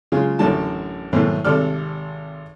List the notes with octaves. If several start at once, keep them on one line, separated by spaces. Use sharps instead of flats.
C#3 F#3 G#3 F4 G#4
A1 F#2 D3 E3 F#4 A5
G#2 B2 D#3 E3 F#3 A3
G#1 C3 A4 D5 F6